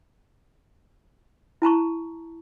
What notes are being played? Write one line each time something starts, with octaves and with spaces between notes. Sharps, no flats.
E4 A5 A#5 C#6